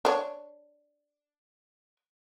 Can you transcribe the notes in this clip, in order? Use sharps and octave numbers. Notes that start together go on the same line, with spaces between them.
D4 C#5